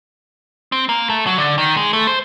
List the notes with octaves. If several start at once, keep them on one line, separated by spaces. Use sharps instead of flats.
C4
A#3
A3
F#3
D3
D#3
G#3
A3
C5